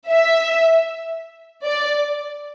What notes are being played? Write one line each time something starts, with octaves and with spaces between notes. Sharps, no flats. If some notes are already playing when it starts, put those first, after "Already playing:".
E5
D5